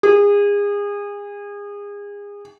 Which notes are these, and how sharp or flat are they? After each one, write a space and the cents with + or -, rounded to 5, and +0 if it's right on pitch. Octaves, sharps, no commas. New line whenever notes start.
G#4 -30